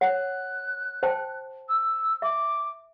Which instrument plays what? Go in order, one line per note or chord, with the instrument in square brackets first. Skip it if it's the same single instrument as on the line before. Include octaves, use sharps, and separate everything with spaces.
[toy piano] C#5 F#5 [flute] F#6
[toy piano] C5 G5 A5
[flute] E6
[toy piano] E5 [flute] D6